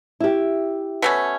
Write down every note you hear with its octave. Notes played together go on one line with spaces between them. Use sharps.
E4 G4
B2 A3 C#4